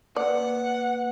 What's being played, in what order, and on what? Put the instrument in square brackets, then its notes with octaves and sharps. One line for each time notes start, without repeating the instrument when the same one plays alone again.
[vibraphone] A#3 B4 [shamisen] D5 [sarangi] F#5